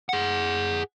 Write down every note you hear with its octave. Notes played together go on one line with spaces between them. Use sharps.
G#4 F#5